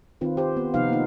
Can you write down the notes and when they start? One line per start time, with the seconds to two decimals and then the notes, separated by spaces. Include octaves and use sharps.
0.21 D#3 C4 F4 B4
0.37 G4 C5
0.57 B3
0.74 C3 F3 B3 D#4 B4 F5
0.89 A#3 D#4